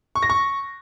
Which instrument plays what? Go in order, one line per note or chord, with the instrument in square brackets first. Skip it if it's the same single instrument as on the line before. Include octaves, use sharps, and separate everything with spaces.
[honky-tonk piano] C#6
A#6
C#6